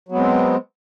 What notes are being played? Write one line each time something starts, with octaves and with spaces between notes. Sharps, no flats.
F#3 G#3 B3 C4